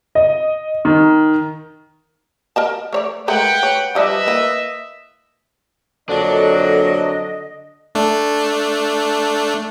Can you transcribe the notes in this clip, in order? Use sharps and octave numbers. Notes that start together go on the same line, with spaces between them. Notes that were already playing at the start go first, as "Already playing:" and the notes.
D#5
D#3
A#4 D#5 A5
A3 C#5 D5
G#3 A3 A#4 B4 F#5 G5
C#5
F3 G3 D4 B4 D#5 E5
A#3 E4
F2 D3 F#3 A#3 D4 D#5
A3 D4